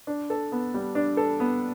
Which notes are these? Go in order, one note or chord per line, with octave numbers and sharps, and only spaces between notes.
D4
A4
B3
G3
D4
A4
B3